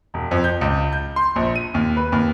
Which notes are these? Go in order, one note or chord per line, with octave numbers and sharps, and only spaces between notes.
E1
F2
G6
C#2
G6
C6
A#1
D#7
D#2
B4
D#2